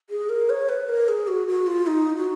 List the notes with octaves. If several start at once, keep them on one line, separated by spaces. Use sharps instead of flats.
G#4
A#4
C#5
B4
A#4
G#4
F#4
F#4
F4
D#4
F#4